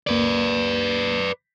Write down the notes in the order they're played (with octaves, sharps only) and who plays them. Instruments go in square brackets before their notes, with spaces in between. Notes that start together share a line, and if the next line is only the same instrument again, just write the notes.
[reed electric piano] C#2 A#3 [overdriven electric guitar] B4 D5